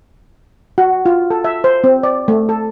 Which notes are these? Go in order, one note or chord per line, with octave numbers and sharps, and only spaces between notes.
F#4
F4
A4
E5
C5
C4
D5
A3
A4